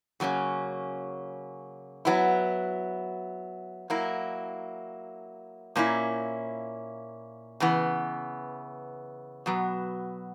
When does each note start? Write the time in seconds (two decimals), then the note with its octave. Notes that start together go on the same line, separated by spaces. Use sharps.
0.20 C#3 F#3 A#3 C#4
2.05 F#3 B3 E4
3.90 F#3 A#3 E4
5.76 A#2 A#3 C#4 E4
7.60 C#3 E3 B3
9.46 B2 F#3 B3